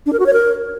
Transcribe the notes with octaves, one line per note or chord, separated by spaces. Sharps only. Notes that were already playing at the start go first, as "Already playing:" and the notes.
D4
A#4
F#4
C#5
A#4